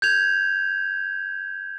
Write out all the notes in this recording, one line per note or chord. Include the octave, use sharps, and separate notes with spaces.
G6 G#6 F7